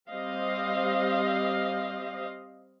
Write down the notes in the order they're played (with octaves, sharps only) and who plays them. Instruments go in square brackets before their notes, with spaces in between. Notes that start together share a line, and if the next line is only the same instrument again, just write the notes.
[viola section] G3 C4 D#5 F5